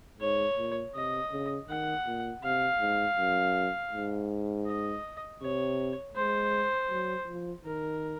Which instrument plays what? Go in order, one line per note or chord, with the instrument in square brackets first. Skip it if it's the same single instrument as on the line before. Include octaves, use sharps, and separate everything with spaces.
[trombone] G#2 [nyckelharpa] C#5
[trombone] A#2
[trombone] C3 [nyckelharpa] D#5
[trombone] C#3
[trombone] D#3 [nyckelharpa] F#5
[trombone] A#2
[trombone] C3 [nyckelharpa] F5
[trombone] G#2
F#2
G#2
[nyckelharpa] D#5
[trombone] C3 [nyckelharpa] C#5
[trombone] G#3 [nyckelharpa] C5
[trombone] F#3
F3
[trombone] D#3 [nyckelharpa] A#4